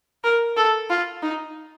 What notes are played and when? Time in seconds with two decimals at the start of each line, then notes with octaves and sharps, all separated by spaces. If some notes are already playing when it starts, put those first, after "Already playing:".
0.24 A#4
0.57 A4
0.90 F4
1.23 D#4